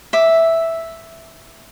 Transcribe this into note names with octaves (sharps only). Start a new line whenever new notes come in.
E5 D6